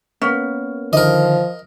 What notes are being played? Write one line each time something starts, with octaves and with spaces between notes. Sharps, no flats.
A#3 B3 C#4 A#4
D3 D#3 F3 A#4 D#5